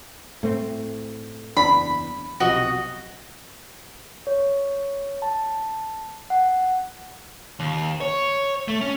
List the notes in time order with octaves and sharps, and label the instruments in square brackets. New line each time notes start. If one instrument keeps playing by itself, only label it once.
[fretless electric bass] A2 A3 C4
[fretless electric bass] F#1 E2 D4 [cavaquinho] B5
[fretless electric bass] B1 C3 F3 [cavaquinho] F#4 D#5
[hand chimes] C#5
A5
F#5
[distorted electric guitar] D#2
C#5
A3
C#4